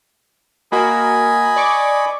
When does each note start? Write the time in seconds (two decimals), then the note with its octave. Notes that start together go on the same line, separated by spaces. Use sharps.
0.72 A#3 F#4 A#4 D#5 G#5 B5
1.56 D5 C#6 D6